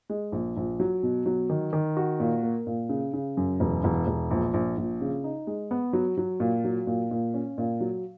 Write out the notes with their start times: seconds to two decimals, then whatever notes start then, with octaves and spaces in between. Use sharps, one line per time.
0.10 G#3
0.32 A#1
0.57 A#1
0.80 F#3
1.03 B2
1.26 F#3
1.50 D#3
1.73 D#3
1.97 F#4
2.20 A#2
2.43 A#3
2.67 A#2
2.89 C#3
3.13 C#3
3.37 F#2
3.60 E1
3.84 E1
4.07 E1
4.31 A#1
4.54 A#1
4.77 A#1
5.01 C#3
5.24 D#4
5.47 G#3
5.71 B3
5.93 F#3
6.18 F#3
6.40 A#2
6.64 F#3
6.87 A#2
7.11 A#2
7.34 C#4
7.58 A#2
7.81 F#3